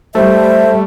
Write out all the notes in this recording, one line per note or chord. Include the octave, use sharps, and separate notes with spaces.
G3 A3 C5 E5